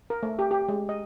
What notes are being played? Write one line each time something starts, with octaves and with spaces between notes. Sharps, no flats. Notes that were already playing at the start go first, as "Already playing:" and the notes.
A#4
A3
G4
G4
G#3
D#5